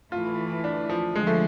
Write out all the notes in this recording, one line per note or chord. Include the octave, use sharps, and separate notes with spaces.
A2 E3 A3 E4 F4
D4
F3
D3 F3 G#3
A3